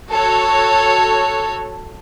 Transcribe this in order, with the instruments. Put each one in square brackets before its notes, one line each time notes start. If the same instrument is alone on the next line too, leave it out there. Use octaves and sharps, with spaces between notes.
[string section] F#4 A4 C#5